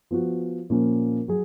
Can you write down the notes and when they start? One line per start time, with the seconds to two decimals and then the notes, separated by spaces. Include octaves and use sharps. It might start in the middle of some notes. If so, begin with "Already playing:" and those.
0.11 F3 B3 F#4
0.70 A#2 F3 A#3 C#4 F4
1.28 F#3 G#4